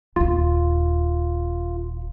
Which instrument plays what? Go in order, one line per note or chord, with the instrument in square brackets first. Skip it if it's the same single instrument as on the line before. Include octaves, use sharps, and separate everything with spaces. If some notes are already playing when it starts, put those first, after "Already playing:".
[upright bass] D#1 D#2 [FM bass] F4